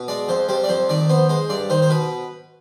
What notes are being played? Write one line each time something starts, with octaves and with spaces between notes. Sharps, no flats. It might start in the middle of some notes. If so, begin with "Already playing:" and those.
Already playing: B2
G#3 D5
F2 C5
G3 C5
D5
F2 C5
D#3 D5
B3 C5
G#3 C5
G2 D5
D#3 C5
C5
B2 B4